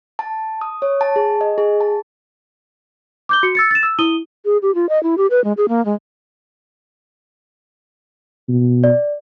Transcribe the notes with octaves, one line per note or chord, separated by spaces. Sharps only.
A5
D#6
C#5
A5
G#4
D#5
G#4
A5
D6 G6 G7
F#4 C#7
E6 A6 C#7
A6 E7
E6
E4 D#6 D#7 G7
G#4
G4
F4
D#5
E4
G4
B4
G#3
G#4
A#3
G#3
B2
D5